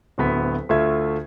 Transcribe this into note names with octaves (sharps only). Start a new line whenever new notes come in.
D1 D2 B3 B6
D2 A3 F4 E5 G#6